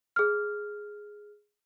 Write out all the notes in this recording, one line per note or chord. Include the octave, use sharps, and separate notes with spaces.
G#4 F6